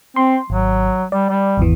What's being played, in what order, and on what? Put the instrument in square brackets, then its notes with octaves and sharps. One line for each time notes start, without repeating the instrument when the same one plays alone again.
[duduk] C4 [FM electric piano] C6
[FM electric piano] G#1 [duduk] F#3
[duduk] G3 [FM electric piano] D5
[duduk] G3
[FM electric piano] G#1 E2 E3